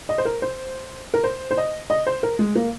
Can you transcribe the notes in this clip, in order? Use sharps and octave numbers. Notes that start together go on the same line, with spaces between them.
D#5
C5
A#4
C5
A#4
C5
C5
D#5
D#5
C5
A#4
G#3
A#3